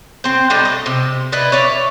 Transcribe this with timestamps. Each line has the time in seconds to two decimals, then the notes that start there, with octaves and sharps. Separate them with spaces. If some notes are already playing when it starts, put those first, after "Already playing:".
0.24 C4 C5
0.50 G3 A3 D4 D#4
0.65 D#5
0.86 C3
1.32 E4 B4 D5 D#5
1.52 C#5 D5 E5